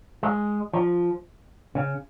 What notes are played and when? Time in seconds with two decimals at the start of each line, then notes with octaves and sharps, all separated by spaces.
0.23 G#3
0.73 F3
1.75 C#3